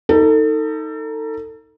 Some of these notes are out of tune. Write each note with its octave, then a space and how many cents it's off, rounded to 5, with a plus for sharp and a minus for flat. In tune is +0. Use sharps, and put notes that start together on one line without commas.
D#4 +15 A4 +30